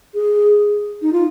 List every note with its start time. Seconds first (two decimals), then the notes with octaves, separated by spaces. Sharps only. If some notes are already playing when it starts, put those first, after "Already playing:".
0.14 G#4
1.02 D#4
1.13 F4